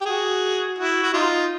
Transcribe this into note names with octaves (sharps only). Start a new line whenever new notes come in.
G4
F#4 G#4
E4 F#4
F#4
D#4 F4